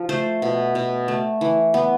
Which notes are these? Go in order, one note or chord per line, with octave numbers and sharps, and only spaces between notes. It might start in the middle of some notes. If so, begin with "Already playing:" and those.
Already playing: F3 F4
A3 C5
B2
B2
A3
E3
B3